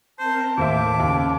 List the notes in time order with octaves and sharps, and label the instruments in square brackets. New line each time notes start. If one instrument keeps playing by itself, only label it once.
[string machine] C4 A#4 [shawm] C5 [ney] A5
[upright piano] D#2 C5 E5 [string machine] A2 D#3 [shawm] D6
[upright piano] D#2 [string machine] C#3